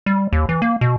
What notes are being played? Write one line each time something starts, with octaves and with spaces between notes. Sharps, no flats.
G3
D#2
E3
A#3
B2